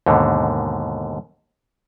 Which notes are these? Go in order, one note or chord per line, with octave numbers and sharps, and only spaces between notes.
D#2 G#2 B2 D3